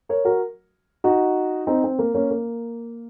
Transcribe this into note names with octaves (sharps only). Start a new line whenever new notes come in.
A#4 C#5
F#4 A#4
D#4 F#4
C4 D#4
C4
A#3
A#3 C#4
A#3